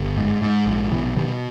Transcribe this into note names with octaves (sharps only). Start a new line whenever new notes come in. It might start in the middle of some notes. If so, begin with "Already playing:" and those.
Already playing: G1
G#2
G#2
A#1
B2 E3
B2 D#3 G3